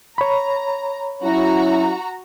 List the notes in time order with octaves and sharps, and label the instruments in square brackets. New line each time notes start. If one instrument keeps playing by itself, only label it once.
[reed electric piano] C#5 B5 [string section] A#5
[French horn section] F#3 C#4 E4 [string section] F#4 A#5